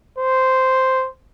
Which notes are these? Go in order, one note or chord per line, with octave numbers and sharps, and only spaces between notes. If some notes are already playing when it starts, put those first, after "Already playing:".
C5